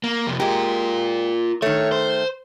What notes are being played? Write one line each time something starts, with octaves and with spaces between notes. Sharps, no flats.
A#3
F2 C3
G#3 F4 G4 A#4
D#3 A3 C#5
C5